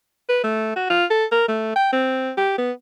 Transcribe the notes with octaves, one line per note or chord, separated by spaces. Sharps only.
B4
A3
F#4
F4
A4
A#4
A3
G5
C4
G4
B3